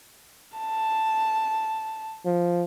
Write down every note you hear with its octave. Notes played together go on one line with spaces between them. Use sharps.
A5
F3